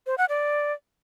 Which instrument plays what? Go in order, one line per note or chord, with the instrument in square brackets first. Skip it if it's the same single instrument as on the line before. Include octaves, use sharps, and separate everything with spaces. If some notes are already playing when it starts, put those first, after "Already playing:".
[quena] C5
F#5
D5